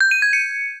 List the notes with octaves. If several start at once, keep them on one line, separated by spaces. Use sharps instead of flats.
G6
D#7
G#6
C#7